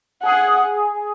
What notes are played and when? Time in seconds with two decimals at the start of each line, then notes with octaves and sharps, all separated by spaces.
0.23 G#4 F#5